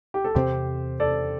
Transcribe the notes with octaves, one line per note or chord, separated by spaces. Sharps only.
G4
A4
E2 C3 A3 C4 G4 C5
A4 D5